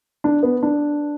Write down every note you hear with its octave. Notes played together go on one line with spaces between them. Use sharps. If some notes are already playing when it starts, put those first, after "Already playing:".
D4
B3
D4